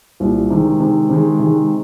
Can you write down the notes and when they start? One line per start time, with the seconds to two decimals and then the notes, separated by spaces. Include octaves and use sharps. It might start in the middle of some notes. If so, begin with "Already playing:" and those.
0.20 C2 A#2 G3
0.50 C3 D#3 G#3
0.80 C3 D#3 G#3
1.09 C3 D#3 G#3
1.40 C3 D#3 G#3